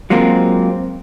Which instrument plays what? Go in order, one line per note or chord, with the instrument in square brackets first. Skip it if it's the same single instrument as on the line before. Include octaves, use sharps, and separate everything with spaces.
[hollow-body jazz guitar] F#3 G#3 A#3 C4 F4